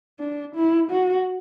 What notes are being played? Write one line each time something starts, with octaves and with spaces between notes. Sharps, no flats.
D4
E4
F#4